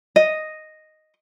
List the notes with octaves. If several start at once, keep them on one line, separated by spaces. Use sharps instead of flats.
D#5